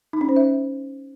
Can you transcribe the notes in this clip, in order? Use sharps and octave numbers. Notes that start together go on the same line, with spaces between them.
D#4
C#4
C5
E5